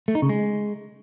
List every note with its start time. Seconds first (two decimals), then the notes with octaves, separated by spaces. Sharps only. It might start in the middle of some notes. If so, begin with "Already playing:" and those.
0.08 A3
0.15 D#4
0.22 C#3
0.29 G#3